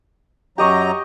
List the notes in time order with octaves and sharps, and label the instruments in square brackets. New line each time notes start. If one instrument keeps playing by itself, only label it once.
[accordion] F#2 F#3 A#5 [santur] G4 D#5 C#6